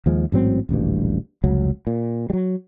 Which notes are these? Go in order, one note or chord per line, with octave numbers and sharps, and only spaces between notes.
D#2 F3 G#3
A1 G#2 F#3 C4
D#1 A1 D2 G2
F1 C#2 F#3
A#2
F#3 G3